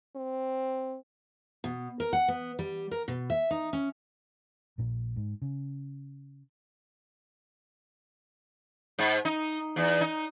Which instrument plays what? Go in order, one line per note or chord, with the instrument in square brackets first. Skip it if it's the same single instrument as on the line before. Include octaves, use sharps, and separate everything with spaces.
[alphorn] C4
[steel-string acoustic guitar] B2
A#4
F#5
B3
G3
A#4
B2
E5
D#4
C#4
[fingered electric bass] A#1 A#2 A#3
G#2
C#3
[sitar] G#2
D#4
E2
D#4